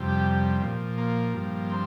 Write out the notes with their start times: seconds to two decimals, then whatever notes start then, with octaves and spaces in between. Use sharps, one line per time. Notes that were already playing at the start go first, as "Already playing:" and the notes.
Already playing: F2 C3 G3
0.08 G4
0.62 A#2 F3
0.98 A#3
1.33 G2 F3
1.69 C4